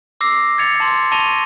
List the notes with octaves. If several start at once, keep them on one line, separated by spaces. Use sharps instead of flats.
D6 E6 A#6 C7
G#6 A6 C#7 F7
A5 C6
A5 C#6 A#6 D#7 F7 G7